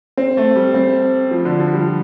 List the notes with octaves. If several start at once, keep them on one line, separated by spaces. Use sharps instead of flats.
C4
A3
G3
C4
F3
D3
F3
G3